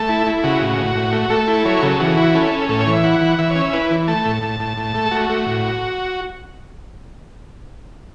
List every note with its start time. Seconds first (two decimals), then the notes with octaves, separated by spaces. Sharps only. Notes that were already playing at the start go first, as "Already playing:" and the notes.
Already playing: A3 A5
0.09 E4
0.27 E4
0.44 C#3 F#4
0.61 A2
0.78 A2
0.96 A2
1.13 A3
1.30 A3 A4
1.48 E4
1.65 F#3 C#5
1.82 C#3 A4
2.00 E3 F#4
2.17 E4
2.34 C#4 A4
2.52 C#4
2.69 A2 A4
2.80 C#5
2.87 E3
2.93 E5
3.04 E4 F#5
3.21 E3
3.39 E3 E5
3.50 C#5
3.55 C#4
3.61 E5
3.73 E4 B4
3.91 E3
4.08 A3 A5
4.25 A2
4.43 A2
4.60 A2
4.77 A2
4.94 A3
5.06 A4
5.11 A3 F#4
5.30 A3
5.46 A2